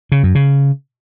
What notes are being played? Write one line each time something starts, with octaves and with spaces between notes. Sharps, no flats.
C#3
F#2
C#3